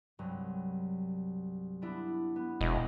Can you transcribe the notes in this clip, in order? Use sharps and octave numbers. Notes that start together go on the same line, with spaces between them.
C2 G2 F#3
B3 D4 E4
B3
E1 D#5